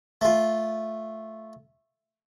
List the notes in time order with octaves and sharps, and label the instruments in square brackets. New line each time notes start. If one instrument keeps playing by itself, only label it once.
[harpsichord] A3 F4